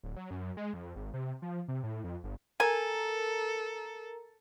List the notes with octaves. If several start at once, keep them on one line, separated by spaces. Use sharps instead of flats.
D1
F#3
F#2
G#3
F2
G#1
C3
F3
C3
A2
F2
G1
A4 A#4 G#5 A#5